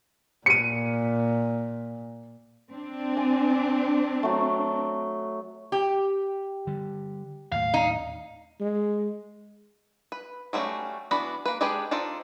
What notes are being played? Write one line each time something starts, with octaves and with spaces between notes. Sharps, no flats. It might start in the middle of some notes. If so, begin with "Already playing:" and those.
A#2 C#7 D#7
C4 D4
G#5
F#3 A3
G4
D3 G3
D#2 A2 F5
D#4
G#3
B4
F#3 G3 A3 C#4 F#4
E3 B3 D4 F#4 B5
A#3 B4
G#3 D4 G4 G#4 B4
D4 D#4 F4 A4 C5